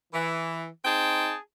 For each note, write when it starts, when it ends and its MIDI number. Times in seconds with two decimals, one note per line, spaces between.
0.13 0.67 52
0.85 1.35 60
0.85 1.35 63
0.85 1.35 68
0.85 1.35 79
0.85 1.35 81